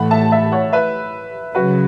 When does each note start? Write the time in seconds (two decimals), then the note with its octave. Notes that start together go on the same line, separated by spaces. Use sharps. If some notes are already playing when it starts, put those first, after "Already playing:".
Already playing: A2 E3 A3 F#5 B5
0.11 E5 A5
0.32 E5 A5
0.52 C#5 F#5
0.73 B4 E5
1.55 C#3 F#3 F#4 B4